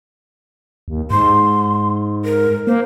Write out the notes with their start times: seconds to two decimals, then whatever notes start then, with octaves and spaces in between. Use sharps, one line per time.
0.88 D#2
1.11 G#2 C6
2.25 A#4
2.67 A#3 C5